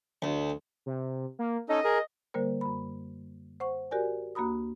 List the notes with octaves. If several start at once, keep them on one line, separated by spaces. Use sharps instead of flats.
D2
C3
A#3
C#4 D#4 A4 D#5
G#4 A#4
D3 G3 A#3 A#4 C5
F#2 B5
C5 F#5 C#6
F#4 G4 A#4 D5 G#5
D2 A#3 F#4 A#5 B5 D#6